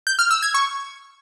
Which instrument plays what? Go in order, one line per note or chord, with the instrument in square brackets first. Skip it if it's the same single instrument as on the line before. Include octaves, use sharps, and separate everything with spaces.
[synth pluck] G6
F6
E6
G#6
C#6